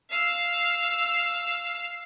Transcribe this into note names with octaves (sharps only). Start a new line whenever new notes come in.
F5 E6